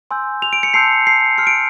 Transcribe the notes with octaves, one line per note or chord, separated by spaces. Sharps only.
G#5 C6 E6 G6
F7
D7
C#7
A5 C6 E6 G6 C7
C7
C6 F6 C#7
D7